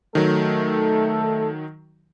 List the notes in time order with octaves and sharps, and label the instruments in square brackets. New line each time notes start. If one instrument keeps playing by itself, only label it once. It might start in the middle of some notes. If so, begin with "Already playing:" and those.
[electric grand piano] D#3 F#3 [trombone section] A3 A4